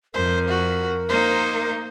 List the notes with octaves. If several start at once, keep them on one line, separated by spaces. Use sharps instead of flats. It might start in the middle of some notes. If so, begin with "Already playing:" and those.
F2 A#4 C5
F#4
A#3 D#4 C5